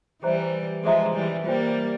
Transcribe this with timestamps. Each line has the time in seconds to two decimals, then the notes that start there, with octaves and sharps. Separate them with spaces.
0.23 E3 G3 G#4 C5 E5 A#5
0.84 F3 G#3 G#4 C5 E5 A#5
1.14 E3 G3
1.45 G3 A#3 F4 C5 G5